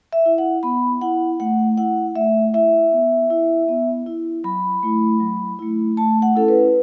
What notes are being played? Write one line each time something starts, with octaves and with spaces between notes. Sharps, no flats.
E5
E4
F#5
B3 B5
E4 F#5
A3 F#5
E4 F#5
A3 E5
E4 E5
B3
E4
B3
E4
F#3 B5
A3 E4
F#3
A3 E4
A3 A5
F#5
C#4 E4 A4
B4